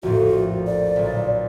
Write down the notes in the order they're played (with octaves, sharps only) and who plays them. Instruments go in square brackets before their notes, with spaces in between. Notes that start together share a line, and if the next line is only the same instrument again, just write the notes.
[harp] A#1 F2 A2 [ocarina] F#4
[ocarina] D5
[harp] B1 A#2